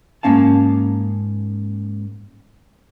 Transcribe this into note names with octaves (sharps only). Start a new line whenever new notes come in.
G#2 A#3 C#4 F5 A5